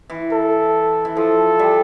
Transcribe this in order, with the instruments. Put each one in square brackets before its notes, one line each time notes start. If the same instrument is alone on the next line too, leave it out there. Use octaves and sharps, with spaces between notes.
[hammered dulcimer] E3
[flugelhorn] A4
[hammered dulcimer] E3
[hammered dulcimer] F3 [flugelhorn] A4
[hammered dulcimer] G3